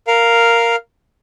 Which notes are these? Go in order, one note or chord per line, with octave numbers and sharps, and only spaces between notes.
A#4 F5